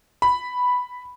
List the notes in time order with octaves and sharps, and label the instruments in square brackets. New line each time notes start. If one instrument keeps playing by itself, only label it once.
[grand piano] B5